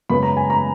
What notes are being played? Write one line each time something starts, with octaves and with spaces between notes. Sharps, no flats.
F#2 C#3 G#3 B3 B5
A#5
G#5
A#5